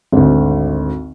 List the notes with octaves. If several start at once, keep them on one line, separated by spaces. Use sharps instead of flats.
G#1 D2